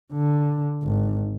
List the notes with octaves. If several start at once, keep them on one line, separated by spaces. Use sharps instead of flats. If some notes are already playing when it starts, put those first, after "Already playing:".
D3
G#1